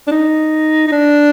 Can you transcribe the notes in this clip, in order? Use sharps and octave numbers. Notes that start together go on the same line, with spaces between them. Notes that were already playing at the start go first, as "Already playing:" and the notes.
D4
D#4
D#4
D4